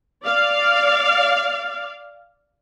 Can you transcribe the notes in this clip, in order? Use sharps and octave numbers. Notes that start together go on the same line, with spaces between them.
D5 F5